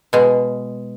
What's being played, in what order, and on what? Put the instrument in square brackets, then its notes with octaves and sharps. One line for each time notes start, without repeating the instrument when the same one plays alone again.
[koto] B2 G#3